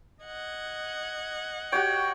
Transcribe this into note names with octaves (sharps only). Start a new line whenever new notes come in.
D#5 F#5 G#6
F#4 G4 C#5 G5